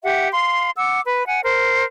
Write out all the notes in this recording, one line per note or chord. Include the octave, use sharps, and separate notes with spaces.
G4 E5 F#5
F5 C6
F#5 D6 E6
B4 B5
F#5 G#5
A#4 C5